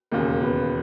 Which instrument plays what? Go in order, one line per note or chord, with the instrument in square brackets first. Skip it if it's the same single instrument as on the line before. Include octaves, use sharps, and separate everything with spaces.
[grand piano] E1 D#2 C#3 [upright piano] A#3
[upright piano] B3